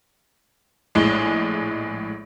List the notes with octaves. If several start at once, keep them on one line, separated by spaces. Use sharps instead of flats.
A#1 A2 G#3